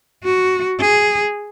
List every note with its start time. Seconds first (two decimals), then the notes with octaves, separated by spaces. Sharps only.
0.24 F#4
0.80 G#4